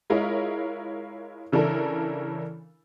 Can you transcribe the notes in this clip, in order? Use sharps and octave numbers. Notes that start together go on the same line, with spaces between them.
G#3 E4 F4 A#4 C#5 D#5
C#3 E3 D4 A4 A#4